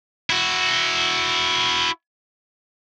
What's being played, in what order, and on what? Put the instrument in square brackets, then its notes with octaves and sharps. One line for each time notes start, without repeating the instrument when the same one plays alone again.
[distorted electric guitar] E4 F#4